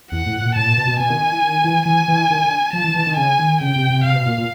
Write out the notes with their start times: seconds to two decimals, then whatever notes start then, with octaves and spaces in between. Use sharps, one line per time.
0.11 E2 F#5
0.26 A2
0.41 A#2
0.55 A2 A5
0.66 A#2
0.77 B2
0.87 B2
0.99 B2 G#5
1.10 D#3
1.20 D#3
1.32 E3
1.42 D#3
1.64 E3
1.86 E3 G#5
2.08 E3
2.30 D#3
2.44 D3
2.73 F3 A5
2.84 E3
2.95 E3
3.07 D#3
3.17 C#3 G#5
3.39 D#3
3.61 C#3 G5
3.76 C3
3.90 C3
4.04 C3 F5
4.15 B2
4.26 A#2
4.38 A#2